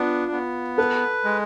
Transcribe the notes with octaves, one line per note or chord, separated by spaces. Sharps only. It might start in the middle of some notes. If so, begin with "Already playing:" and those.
Already playing: B3 D4 F4
B3
A4 B4
G#3